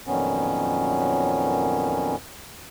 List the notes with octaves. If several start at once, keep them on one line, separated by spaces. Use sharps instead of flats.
F2 A#2 D#3 F#3 B3 C#4